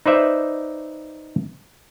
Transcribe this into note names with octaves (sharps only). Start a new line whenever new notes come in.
D#4 B4 C5 D5 E5